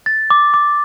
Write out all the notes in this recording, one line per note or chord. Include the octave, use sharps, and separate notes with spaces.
A6
D6
D6